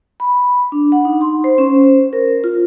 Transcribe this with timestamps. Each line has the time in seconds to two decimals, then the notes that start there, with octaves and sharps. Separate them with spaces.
0.20 B5
0.72 D4
0.92 F#5
1.05 D#4
1.21 C6
1.44 C5
1.58 C#4
1.84 C5
2.13 A#4
2.44 F4